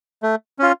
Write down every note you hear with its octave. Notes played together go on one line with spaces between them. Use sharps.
A3
C#4 F4